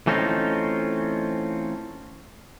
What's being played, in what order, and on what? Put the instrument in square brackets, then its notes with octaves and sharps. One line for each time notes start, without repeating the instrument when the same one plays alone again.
[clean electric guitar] E3 A3 C4 C#4 D#4 F4